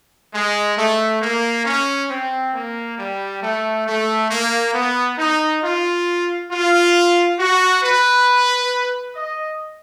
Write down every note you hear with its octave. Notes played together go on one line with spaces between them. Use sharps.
G#3
A3
A#3
C#4
C4
A#3
G3
A3
A3
A#3
B3
D#4
F4
F4
F#4
B4
D#5